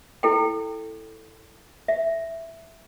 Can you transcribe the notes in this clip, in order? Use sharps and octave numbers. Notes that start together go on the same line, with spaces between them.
E4 A4 G5
E5